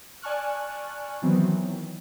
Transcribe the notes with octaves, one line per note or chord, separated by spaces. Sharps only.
D5 G#5 A5 C#6 F6 F#6
D#3 E3 F#3 B3 C4